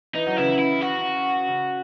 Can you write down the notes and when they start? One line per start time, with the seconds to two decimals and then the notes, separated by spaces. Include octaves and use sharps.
0.14 E3 D#4
0.27 F#3
0.36 C#3 E3 E4
0.59 E4
0.81 F#4
1.48 C#3